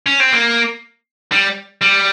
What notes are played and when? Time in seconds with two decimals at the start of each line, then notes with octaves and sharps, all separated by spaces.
0.06 C#4
0.20 C4
0.33 A#3
1.32 G3
1.81 G3